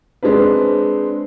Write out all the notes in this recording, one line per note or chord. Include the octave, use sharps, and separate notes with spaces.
G#3 C4 D4 B4